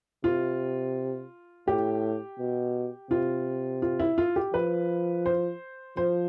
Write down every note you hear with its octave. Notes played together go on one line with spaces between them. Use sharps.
C3 F4
A2 G4
B2
C3 F4
F4
E4
F4
G4
F3 B4
C5
F3 C5